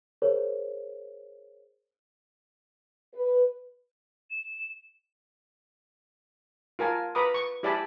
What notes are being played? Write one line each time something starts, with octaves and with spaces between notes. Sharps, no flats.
G#4 A#4 C5 C#5
B4
E7
F4 A#4 G#5 A5
B4 A#5 B5 D6 D#6
C#6
E4 G4 D5 G#5 A5 B5